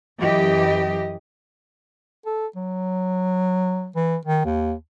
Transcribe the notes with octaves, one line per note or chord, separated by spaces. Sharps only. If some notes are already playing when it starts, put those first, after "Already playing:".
F#2 E3 G4 D#5
A4
F#3
E3
D#3
D#2